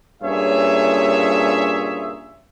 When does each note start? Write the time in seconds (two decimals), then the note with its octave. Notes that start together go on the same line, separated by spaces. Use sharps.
0.22 G2 A#2 C#4 G#4 C#5 E5